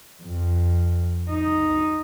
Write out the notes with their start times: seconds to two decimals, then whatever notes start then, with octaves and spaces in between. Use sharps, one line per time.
0.23 F2
1.30 D#4